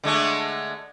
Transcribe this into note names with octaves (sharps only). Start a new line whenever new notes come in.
D3 G#3 A3